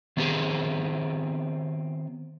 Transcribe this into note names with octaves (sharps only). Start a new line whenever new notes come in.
D#3 B3 C4 G4 G#4